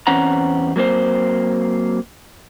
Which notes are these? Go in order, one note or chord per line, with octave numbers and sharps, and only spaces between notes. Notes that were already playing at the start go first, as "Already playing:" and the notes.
E2 C4 C#4 F#5 A#5
F#3 A#3 C4 C5